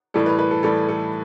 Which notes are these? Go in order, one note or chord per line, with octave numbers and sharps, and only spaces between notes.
A2 E3 G3 A4
B4
B4
A4
A2 E3 G3 A4
A4